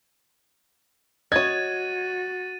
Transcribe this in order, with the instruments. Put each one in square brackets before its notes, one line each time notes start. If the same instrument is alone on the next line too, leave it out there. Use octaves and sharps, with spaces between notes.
[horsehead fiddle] F#4 [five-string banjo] C#5 D#5 [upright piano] G#6 [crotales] A6 D#7